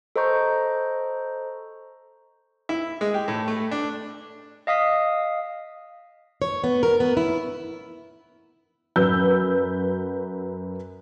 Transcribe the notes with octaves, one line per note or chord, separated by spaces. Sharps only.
A4 C5 D#5 A#5 C#6 G6
E4
G#3
G4
A2
A3
D4
D#5 F5 D#6 B6
C#5
B3
A#4
B3
E4
F#2 F#3 B4 E6 G6